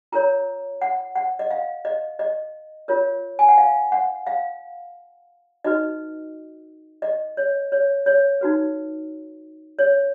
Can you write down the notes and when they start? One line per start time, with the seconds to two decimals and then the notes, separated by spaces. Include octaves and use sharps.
0.12 F4 A#4 C#5 A#5
0.82 F#5
1.16 F#5
1.39 D#5
1.51 F5
1.85 D#5
2.19 D#5
2.88 F4 A#4 C#5
3.39 G#5
3.48 F#5
3.58 F5
3.92 F#5
4.27 F5
5.64 D#4 F#4 B4 D#5
7.02 D#5
7.37 C#5
7.72 C#5
8.06 C#5
8.41 D#4 F#4 B4
9.79 C#5